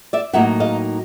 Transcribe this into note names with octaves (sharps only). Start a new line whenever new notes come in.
D5 E5
A2 F#3 A#3 D#4 E5 F#5
D#5 F5